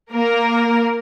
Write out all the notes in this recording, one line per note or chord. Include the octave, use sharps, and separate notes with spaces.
A#3 A#4